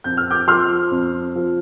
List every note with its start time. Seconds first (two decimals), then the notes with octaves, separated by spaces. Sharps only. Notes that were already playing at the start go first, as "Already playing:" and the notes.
0.04 F2 G6
0.17 F6
0.30 D6 G6
0.47 F3 C6 F6
0.91 F2
1.35 F3